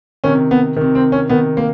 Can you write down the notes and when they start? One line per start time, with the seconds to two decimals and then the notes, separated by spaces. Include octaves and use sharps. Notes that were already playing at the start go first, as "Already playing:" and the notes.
0.24 C3 D#3 C#4
0.51 B3
0.77 C3 D#3
0.95 C4
1.12 C#4
1.29 C3 D#3 B3
1.57 A#3